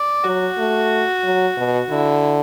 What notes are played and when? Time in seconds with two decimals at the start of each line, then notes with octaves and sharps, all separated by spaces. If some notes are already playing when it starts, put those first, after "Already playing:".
Already playing: D5
0.24 F#3 F#4
0.58 A3
1.24 F#3
1.57 B2
1.90 D3 E4